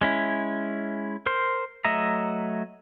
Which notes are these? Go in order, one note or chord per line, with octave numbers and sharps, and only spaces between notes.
G#3 C#4 E4
A#4 C5 C6
F#3 A3 D#5 E5 A#5